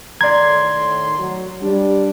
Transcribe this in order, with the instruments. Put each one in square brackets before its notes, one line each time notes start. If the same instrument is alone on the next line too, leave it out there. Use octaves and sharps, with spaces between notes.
[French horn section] A2 D#3 [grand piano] D5 A#5 [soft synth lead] C6 [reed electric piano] G#6
[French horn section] F#3
[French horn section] G3 [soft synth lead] D4